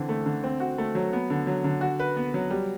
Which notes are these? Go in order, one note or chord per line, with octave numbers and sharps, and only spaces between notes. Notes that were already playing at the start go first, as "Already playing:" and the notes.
Already playing: D3 E3 C4
A3
D3
C4
F#4
A3
F#3
B3
D3
F#3
D3
F#4
B4
B3
F#3
G3